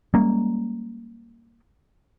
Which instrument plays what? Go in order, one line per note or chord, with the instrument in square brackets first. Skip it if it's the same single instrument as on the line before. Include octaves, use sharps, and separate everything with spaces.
[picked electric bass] G3 G#3 A#3 C#4